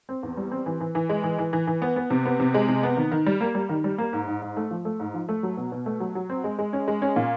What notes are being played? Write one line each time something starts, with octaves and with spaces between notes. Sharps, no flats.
C4
E2
G3
C4
E3
E3
E3
G#3
E3
E3
E3
E3
B3
B3
C3
B3
C3
G#3
C3
B3
D#3
D#3
G3
A#3
G3
D#3
G3
A#3
G#2
G#2
G#2
A3
F3
A3
G#2
F3
A3
F#3
B2
B2
A3
F#3
F#3
C4
G#3
G#3
C#4
G#3
C#4
A#2